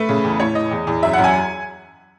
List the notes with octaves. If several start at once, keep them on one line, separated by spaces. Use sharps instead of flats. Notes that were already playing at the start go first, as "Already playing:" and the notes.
Already playing: A3 B4
C#3
E2
A2 C#5
E3 D#5
E2
E2
F#2 E5
F#2 F#5
G#5